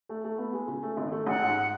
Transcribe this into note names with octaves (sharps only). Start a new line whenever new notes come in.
A3
A3
B3
G#3
C#3
A3
G#1
A3
A1 F#5
G#2